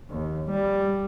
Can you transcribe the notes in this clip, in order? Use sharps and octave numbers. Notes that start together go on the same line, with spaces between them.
D#2
G3